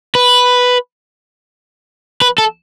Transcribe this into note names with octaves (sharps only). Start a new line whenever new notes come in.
B4
B4
A4